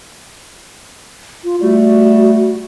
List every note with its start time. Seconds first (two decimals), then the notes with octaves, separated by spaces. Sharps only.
1.44 F4
1.61 G3 A3 F#4